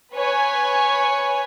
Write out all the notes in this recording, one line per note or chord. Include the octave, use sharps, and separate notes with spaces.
B4 C#5 G#5